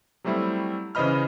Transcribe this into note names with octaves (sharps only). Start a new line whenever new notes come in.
F#3 G3 A3 C4 E4
C#3 E3 C5 D#5 B5 F6